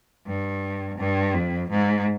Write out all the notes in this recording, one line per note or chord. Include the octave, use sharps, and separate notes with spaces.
G2
G2
F2
G#2